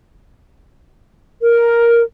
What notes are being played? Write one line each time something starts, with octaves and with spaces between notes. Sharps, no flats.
A#4